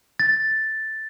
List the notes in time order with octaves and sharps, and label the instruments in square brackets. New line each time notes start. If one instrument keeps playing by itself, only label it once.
[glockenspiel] A6